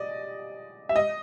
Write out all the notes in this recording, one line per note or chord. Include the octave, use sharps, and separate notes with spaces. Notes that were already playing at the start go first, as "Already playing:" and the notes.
Already playing: D5 D#5
E5
D#5